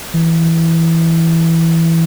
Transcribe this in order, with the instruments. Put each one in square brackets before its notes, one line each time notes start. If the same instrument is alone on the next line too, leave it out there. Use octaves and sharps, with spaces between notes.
[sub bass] E3